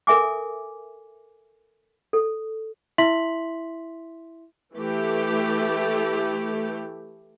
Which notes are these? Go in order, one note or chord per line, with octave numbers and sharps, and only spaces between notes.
A4 A#4 E5 G#5 D6
A4
E4 E5 C6 B6 F#7
E3 A3 G4